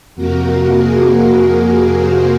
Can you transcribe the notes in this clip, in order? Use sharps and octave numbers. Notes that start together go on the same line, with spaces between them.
F2 C3 F3 A#3 F#4 A#4
F#4 A#4
G#4
G#4
G#4
G#4 C5